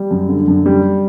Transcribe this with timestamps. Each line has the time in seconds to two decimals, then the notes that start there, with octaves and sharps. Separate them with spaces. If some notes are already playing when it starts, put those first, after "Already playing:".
Already playing: G3
0.11 F#2
0.29 D3
0.48 F#2
0.66 G3